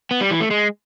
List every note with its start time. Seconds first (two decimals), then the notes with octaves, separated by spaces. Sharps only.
0.11 B3
0.21 G3
0.31 E3
0.41 A3
0.51 G#3